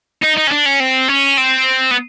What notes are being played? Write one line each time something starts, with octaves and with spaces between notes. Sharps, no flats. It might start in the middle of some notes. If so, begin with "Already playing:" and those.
D#4
D#4
C#4
D4
C#4
C4
C#4
C4
B3